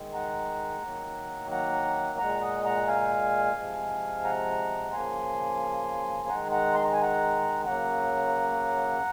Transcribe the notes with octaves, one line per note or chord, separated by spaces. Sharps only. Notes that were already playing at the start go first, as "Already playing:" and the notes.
Already playing: D#3 G#3
F#5 A#5
D#3 F#3 A#3
F#5 A#5
A#2 G#3 F#5 A#5
D#5 F#5
F#5 A#5
F5 G#5
C3 F3 G#3
F#5 A#5
C#3 F3 A#3 G#5 C6
D#3 G#3 F#5 A#5
F#5 A#5
C6
A#5
G#5
F#5 A#5
C#3 F#3 A#3 F#5 A#5